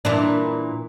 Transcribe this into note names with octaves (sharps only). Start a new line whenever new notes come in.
A#2 E3 D4